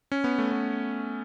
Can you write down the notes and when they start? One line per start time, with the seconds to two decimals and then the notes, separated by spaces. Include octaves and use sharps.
0.12 C#4
0.24 B3
0.38 A3
0.52 B3